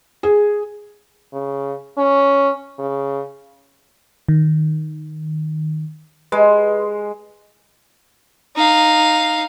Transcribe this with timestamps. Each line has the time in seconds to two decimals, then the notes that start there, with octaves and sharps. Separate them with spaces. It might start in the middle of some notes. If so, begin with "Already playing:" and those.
0.23 G#4
1.34 C#3
1.98 C#4
2.79 C#3
4.29 D#3
6.32 G#3 B4
8.56 D#4 F5